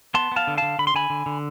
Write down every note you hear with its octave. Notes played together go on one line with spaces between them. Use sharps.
B3 A5 C6
B3 F5 A5
D3
D3 F5 A5
D3 B5
C6
D3 G#5 B5
D3
D3